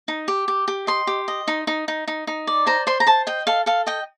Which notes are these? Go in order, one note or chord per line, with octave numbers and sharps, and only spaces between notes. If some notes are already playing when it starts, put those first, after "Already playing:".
D#4
G4
G4
G4
D#5 C6
G4
D#5
D#4
D#4
D#4
D#4
D#4
D5
C5 A#5
C5 C6
A#5
C5 A5
D#5 G5
A4 F5
A4 F5
D#5 G5